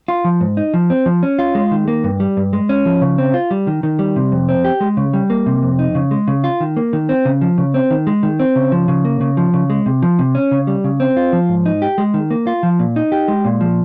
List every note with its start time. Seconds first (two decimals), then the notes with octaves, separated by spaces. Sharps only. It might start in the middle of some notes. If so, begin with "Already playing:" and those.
0.08 F4
0.25 F3
0.41 G#2
0.57 D#4
0.74 F3
0.90 C4
1.06 F3
1.23 C#4
1.39 F4
1.55 G#3
1.71 D#3
1.88 A#3
2.04 G2
2.20 G3
2.37 G2
2.53 G#3
2.69 C#4
2.85 F3
3.02 C#3
3.18 C4
3.34 F4
3.51 G3
3.67 D#3
3.83 D#3
3.99 G3
4.16 C3
4.32 F2
4.49 C4
4.65 G4
4.81 G#3
4.97 C#3
5.13 G3
5.30 A#3
5.46 C3
5.63 F2
5.79 D#4
5.95 C#3
6.11 G#3
6.28 C#3
6.44 F4
6.60 D#3
6.77 A#3
6.93 D#3
7.09 C4
7.25 C#3
7.41 F3
7.58 C#3
7.74 C4
7.91 D#3
8.07 G#3
8.23 D#3
8.39 C4
8.56 C#3
8.72 F3
8.88 C#3
9.05 A#3
9.21 C#3
9.37 F3
9.54 C#3
9.70 G#3
9.86 C3
10.02 F3
10.19 C3
10.35 C#4
10.51 C#3
10.67 G3
10.84 C#3
11.00 C4
11.17 F4
11.33 F3
11.49 G#2
11.66 D#4
11.82 G4
11.98 G#3
12.14 D#3
12.31 A#3
12.47 F4
12.63 F3
12.79 A#2
12.96 D#4
13.12 G4
13.28 G#3
13.45 A#2
13.61 F3